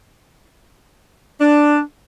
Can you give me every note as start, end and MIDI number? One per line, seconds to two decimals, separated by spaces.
1.41 1.81 62